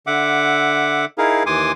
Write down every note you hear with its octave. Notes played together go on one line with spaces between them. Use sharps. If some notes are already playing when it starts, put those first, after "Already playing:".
D3 E5 F#5 D6
D#4 E4 G#4 A#4 F5
D#2 E3 G#5 C6 D6 D#6